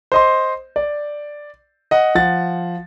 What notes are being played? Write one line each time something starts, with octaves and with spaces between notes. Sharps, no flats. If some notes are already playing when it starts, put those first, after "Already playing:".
C5 D#5 C6
D5
D#5 F#5
F3 F#5 A6